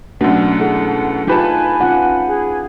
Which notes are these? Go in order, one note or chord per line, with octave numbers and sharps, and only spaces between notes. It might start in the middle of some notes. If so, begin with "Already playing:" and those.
F#2 B2 A3 D4 F#5
E4 G#4 A4
D#4 F4 G4 B4 G#5 A5
C#4 F4 F#5
G#4